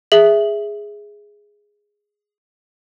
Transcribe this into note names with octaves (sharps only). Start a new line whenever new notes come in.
G#4 E5 F#7